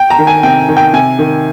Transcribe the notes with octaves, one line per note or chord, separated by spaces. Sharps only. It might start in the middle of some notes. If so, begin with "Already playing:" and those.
Already playing: G5
A#5
D#3
G#5
C3 G5
D#3
G5
C3 G#5
D#3